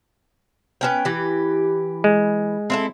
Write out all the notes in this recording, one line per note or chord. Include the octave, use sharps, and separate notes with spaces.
B3 C#4 G5
E3 G4
G#3
C4 E4 A4